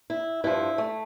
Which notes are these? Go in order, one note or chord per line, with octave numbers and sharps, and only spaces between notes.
E4
G2 F3 E4
A3